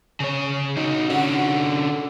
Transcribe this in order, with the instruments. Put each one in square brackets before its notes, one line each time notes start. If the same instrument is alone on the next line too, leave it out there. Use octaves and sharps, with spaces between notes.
[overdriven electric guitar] C#3 C#5
D#4 F#4
[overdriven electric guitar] D3 C#4 [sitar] F#4